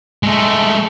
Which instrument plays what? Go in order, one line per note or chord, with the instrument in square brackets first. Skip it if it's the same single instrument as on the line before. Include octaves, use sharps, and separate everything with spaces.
[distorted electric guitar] G#3 A3